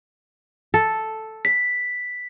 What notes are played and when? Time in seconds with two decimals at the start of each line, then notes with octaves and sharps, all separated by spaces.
0.74 A4
1.45 B6